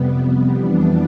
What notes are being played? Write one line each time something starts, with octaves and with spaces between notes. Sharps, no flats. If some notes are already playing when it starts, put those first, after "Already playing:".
Already playing: F2 C3 G3 B3
F2 E3 G3 B3 D4